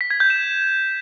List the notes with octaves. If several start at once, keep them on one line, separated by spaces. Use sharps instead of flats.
B6
G#6
G6
E7